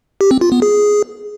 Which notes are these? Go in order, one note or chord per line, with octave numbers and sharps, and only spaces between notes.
G4
C4
F4
B3
G#4